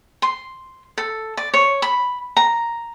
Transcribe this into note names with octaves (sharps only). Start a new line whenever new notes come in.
C6
A4
D5
C#5
B5
A#5